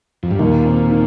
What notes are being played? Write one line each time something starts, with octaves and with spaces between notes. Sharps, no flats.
F2
G2
D#2 A#2
C4
D#3